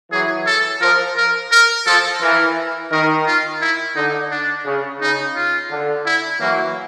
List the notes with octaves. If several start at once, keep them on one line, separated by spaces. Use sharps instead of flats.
E3 F#3 G#4
A4
F3 A#4
A#4
A#4
F3 A4
E3 A#4
D#3 A#4
F4
E4
D3 D#4
D4
C#3
C#3 D#4
F4
D3
E4
E3 F#3 A#3